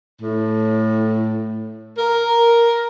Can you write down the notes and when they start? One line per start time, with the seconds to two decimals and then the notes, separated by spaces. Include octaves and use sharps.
0.22 A2
1.98 A#4